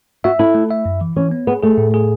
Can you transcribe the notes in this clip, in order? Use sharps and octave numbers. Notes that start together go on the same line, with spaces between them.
F#4 E5
E4 A4
A3
E5
F#2
E3
E3 C#4
B3
B3 G#4
A3 G#4
A2
G#4